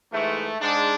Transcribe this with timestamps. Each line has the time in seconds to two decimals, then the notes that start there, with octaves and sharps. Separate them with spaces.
0.13 G#2 E3 G#3 A3
0.60 G#2 G#3 D4